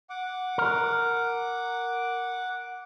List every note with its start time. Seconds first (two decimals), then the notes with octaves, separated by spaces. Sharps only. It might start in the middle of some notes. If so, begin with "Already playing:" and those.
0.10 F#5 D6
0.58 A#4